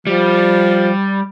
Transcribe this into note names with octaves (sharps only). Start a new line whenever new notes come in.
F3 G3